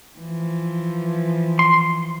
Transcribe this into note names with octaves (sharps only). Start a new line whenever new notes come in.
E3 F3
C6